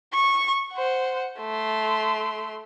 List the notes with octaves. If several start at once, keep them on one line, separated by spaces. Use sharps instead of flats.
C#6
C5 F#5
A3 C6